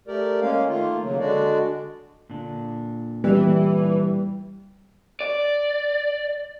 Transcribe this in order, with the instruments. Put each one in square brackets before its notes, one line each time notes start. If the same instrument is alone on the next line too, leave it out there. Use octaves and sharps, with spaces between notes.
[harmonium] A3 G4 A#4 D5
G#3 A#3 C#4 F5
D#3 A3 A#3 F4
C#3 F#3 A#3
D3 G#3 D4 F#4 D5
[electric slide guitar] A#2 D3 D4
[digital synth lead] E3 [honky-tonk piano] G3
[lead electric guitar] D5